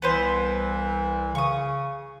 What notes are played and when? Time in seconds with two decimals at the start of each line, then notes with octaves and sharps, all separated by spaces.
0.02 C2 E3 B3 B4 C5
1.35 C#3 C#6 D#6